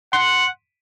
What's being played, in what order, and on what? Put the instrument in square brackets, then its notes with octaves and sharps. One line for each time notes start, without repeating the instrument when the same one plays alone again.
[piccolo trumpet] F#5 [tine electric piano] C6